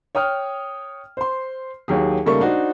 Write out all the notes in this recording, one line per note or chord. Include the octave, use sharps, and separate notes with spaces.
C#5 G5 D#6 F6
C5 C6
D#2 F#3 G4 G#4
C#3 G3 A3 A#3 D#4 C#6
D4 D#4 F#4 C5